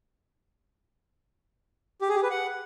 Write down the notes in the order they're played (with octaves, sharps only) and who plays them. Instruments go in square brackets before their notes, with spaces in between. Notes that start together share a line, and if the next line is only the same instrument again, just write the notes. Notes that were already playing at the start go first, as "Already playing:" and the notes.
[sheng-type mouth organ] G4
G#4
G4
B4
F#5